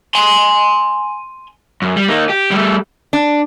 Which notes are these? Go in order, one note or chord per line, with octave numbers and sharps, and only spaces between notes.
G#5 C6
F#2
G3
A#3 D#4
G4
G3 A3
D4